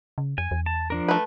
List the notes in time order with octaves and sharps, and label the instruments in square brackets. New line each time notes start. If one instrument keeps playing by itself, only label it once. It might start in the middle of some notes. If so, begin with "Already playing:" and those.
[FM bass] C#3
[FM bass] F2 [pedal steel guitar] G#5
[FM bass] E2
[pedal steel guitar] A5
F3 D4 A#4
[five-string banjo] A3 B4